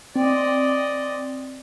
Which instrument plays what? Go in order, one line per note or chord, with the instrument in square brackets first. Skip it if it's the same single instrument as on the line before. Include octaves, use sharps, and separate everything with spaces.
[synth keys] C4 [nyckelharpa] D5 D#5